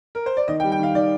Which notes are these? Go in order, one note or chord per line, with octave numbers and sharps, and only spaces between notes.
A#4
C5
D5
D#3 D#5
G5
G3
G5
D#3 F5
D#3 D5